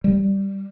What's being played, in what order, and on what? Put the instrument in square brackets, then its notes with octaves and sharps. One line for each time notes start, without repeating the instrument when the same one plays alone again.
[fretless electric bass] G3